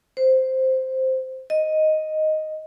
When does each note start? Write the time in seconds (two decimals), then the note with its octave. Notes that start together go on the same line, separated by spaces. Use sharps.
0.17 C5
1.50 D#5